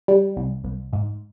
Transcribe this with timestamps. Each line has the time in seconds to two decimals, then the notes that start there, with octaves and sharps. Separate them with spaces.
0.08 G3
0.37 C2
0.64 C2
0.93 G#2